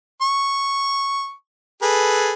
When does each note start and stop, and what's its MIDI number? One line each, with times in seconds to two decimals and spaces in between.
0.22 1.32 85
1.82 2.33 68
1.82 2.33 69
1.82 2.33 71